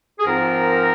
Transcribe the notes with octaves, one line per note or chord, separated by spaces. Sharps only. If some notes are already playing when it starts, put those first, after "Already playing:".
G#4
G#2 F3 C4 F4 A#4